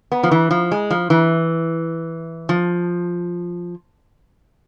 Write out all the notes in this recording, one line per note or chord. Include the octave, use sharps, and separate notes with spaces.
B3
F3
E3
F3
G#3
F3
E3
F3